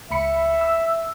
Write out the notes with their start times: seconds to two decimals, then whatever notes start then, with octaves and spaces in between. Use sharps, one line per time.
0.11 C#2 E5 B5 C#7
0.61 E6